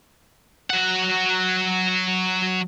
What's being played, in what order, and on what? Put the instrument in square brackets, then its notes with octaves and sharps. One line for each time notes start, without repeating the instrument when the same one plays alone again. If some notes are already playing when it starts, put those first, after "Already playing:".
[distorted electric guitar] F#3 F#5